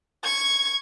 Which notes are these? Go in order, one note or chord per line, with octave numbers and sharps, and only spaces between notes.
C#6 G#6